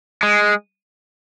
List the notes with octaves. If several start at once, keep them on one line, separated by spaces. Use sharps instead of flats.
G#3